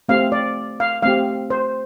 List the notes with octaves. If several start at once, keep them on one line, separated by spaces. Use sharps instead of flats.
A3 C4 G4 F5
D5
F5
A3 C4 G4 F5
C5